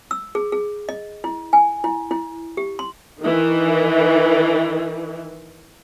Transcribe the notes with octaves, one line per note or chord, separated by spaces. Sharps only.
E6
G#4
G#4
D#5
E4
G#5
E4
E4
G4
C6
D#3 E3